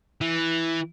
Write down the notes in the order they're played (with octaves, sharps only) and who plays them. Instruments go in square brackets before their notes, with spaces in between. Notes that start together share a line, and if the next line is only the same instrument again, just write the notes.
[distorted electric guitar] E3